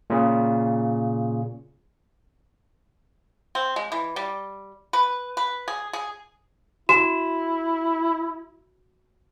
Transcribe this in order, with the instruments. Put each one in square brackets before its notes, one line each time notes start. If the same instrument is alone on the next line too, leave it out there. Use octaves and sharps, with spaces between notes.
[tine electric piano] A#2 C#3
[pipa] C4
G#3
E3
G3
B4
B4
G#4
G#4
[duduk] E4 [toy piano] F#4 [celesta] E7